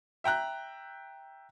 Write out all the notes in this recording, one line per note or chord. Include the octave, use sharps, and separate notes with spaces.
E5 G5 A#5 F#6